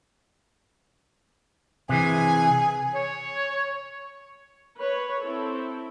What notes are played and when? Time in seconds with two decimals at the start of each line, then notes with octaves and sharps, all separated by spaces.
1.89 C3 E3 G#4
2.95 C#5
4.78 B4 C#5
5.22 C4 E4 A4